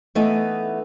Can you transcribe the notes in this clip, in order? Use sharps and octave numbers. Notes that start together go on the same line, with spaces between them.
E3 A3 B3 D#4